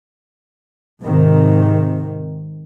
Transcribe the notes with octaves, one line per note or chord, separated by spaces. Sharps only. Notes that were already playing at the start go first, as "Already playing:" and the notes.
G#2 C3 D#3